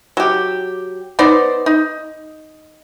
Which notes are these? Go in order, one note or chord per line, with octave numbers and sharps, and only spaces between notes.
F#3 G4
B3 D#4 C5 D5
D#4